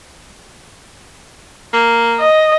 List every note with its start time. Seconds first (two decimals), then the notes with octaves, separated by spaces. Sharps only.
1.73 A#3
2.20 D#5